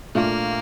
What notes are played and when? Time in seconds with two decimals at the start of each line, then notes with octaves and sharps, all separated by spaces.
0.15 A#2 A3 A#3 D4 F4